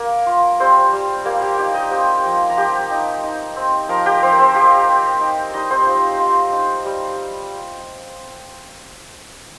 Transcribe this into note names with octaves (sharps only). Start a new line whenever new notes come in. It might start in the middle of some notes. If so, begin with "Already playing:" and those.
Already playing: A#3 A#4
F4
G3 C4 C5
G3
G3 A#3 A#4
G4
D#4 G4
D#4 D#5
C4 G4 G5
F3
A#5
F3 G4 G5
D#4
D#4
C4
F3 A#4 A#5
G4 G5
F3 C4 C5
A#4
C4 C5
F4 G4 G5
C4
D#4
G3 D#4 D#5
C4 C5
F4
F4
D#4
G3